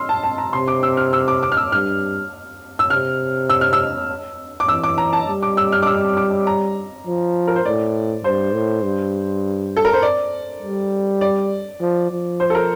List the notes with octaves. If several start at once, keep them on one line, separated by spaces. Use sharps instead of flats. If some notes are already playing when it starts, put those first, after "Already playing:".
Already playing: C6 E6 F6
A5
A5
A#5
C3 C6
D6
E6
F6
E6
D6
D6
F6
E6
G2 F6
E6
C3 F6
E6
F6
E6
D6
E3 E6
D6
A#5
A5
G3
D6
E6
F6
D6
E6
D6
A#5
F3
A#4
C5
A2 D5
G2 C5
A2
G2
A4
A#4
C5
D5
G3
D5
F3
F3
C5
A4
A#4